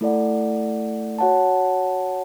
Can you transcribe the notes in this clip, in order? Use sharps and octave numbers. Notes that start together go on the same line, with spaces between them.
A3 E4 A4 D5 F#5
F#4 C#5 F#5 A5